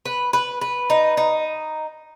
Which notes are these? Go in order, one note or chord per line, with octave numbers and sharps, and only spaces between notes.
B4
B4
B4
D#4
D#4